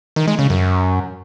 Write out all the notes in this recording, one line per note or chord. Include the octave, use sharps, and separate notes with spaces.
D#3
G#3
C#3
F#2